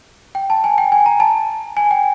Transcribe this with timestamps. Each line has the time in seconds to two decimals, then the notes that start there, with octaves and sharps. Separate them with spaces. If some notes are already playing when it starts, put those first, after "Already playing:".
0.35 G5
0.50 A5
0.64 G#5
0.78 G5
0.92 G#5
1.06 A#5
1.20 A5
1.77 G#5
1.91 G5